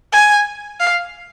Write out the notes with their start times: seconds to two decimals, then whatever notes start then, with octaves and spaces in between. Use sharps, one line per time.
0.12 G#5
0.80 F5